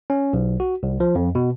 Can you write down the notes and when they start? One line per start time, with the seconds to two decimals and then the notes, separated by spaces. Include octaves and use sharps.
0.10 C#4
0.33 B1
0.60 F#4
0.83 C2
1.00 F3
1.15 F2
1.35 B2